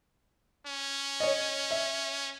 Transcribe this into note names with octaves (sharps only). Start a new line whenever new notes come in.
C#4
C#5 D#5
E5